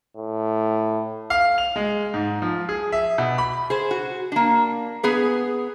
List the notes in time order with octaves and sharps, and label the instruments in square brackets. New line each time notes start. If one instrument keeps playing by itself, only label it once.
[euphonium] A2
[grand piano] F5
F7
G#3
G#2
F3
G#4
E5
B2
B5
[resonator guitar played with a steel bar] G#4 C5
F#4
A#3 D4
B3 G#4 B4